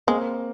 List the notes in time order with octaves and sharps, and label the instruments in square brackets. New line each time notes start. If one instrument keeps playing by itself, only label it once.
[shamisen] G#3 [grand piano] A#3 C4